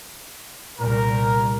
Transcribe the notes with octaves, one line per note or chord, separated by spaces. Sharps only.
C2 A#2 A#4